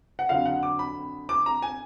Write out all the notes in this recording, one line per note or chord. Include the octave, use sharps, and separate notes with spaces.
F#5
F2 D3 F#3 F5
F#5
D6
B5
D6
A#5
G#5